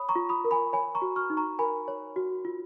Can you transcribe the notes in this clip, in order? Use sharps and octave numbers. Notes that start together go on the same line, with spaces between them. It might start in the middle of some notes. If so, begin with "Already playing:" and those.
Already playing: C#5 B5 D#6
A#5 C#6
F4
B5 D#6
A#4
G#5 B5
C#5 G#5 B5
A#5 C#6
F#4
C#6 F6
D#4
A#5 C#6
A#4 G#5 B5
C#5
F#4
F4